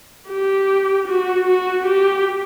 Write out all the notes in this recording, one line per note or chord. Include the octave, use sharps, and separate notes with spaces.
G4
F#4
F#4
G4